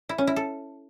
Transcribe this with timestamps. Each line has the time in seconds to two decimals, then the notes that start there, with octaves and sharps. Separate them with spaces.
0.09 E4
0.18 C#4
0.27 E4
0.36 A4